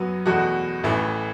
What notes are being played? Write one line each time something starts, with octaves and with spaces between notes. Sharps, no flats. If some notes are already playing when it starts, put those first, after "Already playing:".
Already playing: F#2 F#3 B3 F#4
E2 B2 A3 F#4
A1 A2 E3 A3